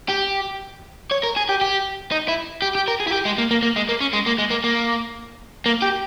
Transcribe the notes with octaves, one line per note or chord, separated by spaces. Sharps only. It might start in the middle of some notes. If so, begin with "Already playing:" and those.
G4
C#5
A#4
G#4
G4
G4
D#4
E4
G4
G4
A#4
G#4
E4
G4
G#3
A#3
A#3
A#3
G#3
A#3
C#4
G#3
A#3
G#3
A#3
A#3
A#3
G4